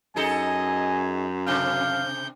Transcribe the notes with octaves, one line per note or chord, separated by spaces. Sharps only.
F#2 D#4 G#4 A4 D#5 G#5
C3 C4 D4 F5 G6